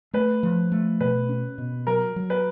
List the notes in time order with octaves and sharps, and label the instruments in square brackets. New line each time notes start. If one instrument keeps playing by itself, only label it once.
[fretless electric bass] A3 [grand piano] B4
[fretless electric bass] F3
A3
[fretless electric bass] B2 [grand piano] B4
[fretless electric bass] C#4
B2
[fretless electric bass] F#3 [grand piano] A#4
[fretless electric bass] F#3
[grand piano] B4